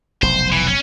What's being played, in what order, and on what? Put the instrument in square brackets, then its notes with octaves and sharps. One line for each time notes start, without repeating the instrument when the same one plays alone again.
[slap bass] F1 B1 [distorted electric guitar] C5
[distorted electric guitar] E3
C#4